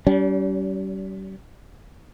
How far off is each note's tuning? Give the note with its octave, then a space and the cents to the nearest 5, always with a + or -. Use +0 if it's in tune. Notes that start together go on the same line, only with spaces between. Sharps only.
G3 -35 C#4 +40